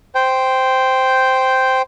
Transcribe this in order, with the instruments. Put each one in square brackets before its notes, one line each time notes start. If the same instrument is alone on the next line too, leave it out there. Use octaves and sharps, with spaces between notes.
[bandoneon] C5 G5